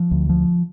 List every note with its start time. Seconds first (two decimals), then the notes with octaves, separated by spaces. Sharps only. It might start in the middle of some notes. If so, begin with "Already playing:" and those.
Already playing: F3
0.11 D2
0.29 F3